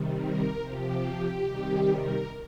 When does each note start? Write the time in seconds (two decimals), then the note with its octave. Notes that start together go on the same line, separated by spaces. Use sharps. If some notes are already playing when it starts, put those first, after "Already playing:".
Already playing: C3 D#3 G3
0.17 A#4
0.59 C3 F3 G4
1.42 C3 D#3 G3
1.84 A#4